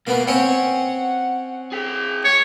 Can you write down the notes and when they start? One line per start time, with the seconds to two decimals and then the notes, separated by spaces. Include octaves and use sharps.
0.07 B2 A#3 B3
0.28 C4 C#4 C#5 F#5
1.72 G#4 G5
2.24 C#5